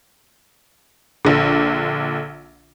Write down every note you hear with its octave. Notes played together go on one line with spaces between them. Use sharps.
A#1 D3